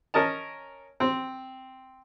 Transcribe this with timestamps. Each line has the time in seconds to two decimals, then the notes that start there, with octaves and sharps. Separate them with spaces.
0.14 C#4 A#4 D#5 A5
1.00 C4